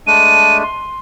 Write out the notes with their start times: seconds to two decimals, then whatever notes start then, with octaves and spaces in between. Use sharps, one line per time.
0.07 G#3 A3 D4 D#7
0.63 C6